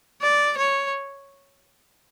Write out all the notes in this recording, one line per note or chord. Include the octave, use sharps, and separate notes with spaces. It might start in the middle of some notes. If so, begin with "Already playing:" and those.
D5
C#5